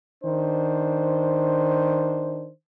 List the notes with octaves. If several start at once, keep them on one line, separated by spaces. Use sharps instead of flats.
D#3 D4 C5